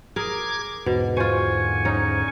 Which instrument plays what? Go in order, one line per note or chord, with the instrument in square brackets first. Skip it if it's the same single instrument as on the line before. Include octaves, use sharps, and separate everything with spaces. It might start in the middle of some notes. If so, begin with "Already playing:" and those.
[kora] G#4 A#4 [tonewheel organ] D6 G#6
[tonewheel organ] E2 G#2 D3 [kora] B2
[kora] F4 C5 [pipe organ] G#5 C#6
[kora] C#4 D#4